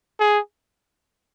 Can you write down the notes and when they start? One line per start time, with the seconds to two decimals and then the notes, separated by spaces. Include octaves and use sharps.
0.20 G#4